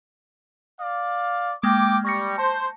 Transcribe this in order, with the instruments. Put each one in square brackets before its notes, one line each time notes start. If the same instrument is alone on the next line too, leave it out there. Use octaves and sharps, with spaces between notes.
[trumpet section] D5 F5
[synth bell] G#3 A#3 F6 [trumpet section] G5 D6
[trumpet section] G3 [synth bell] C#6 A#6 C#7
[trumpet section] C5 [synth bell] A5